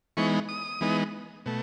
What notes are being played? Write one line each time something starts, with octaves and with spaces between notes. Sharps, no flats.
E3 G#3 B3 D#4 C#6
D#6
E3 G#3 B3 D#4
B2 A3